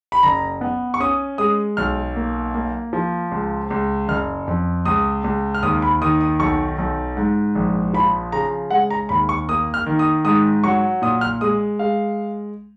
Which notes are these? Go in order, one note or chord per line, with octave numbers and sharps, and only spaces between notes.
B5
F#1 A#5
B3
C#6
C#4 D#6
G#3 D#6
B1 F6
A#3
A#3
F3
C#2
C#2
F#1 F6
F2
C#2 D#6
C#2
F6
D#2 D#6
B5
D#3 D#6
D#6
B1 C#6
B1
G#2
A#1
F3 B5
C#3 A#5
G#3 F#5
A#5
D#2 B5
C#6
A#3 D#6
F6
D#3
D#6
G#2 D#6
F#3 C#6
A#2 D#6
F6
G#3 D#6
G#3 F5